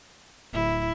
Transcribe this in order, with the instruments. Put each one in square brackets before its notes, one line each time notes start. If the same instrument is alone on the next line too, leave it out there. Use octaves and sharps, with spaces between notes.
[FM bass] D1 [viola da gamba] E4